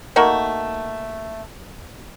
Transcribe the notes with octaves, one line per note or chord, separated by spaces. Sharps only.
A3 A#3 D#4 F#4